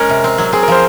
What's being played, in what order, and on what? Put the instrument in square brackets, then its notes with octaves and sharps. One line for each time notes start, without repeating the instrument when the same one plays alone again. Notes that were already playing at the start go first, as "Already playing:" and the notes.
Already playing: [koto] G#3 C#4 [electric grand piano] A#4
[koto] C3
C4
F#3
[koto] C4 [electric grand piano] G#4
[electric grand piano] A#4
[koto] F3 [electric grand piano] C5